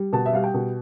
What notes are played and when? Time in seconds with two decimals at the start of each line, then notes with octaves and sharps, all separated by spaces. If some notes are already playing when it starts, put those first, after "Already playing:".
Already playing: G3
0.13 B2 A5
0.26 E5
0.33 G3 F5
0.44 G5
0.54 B2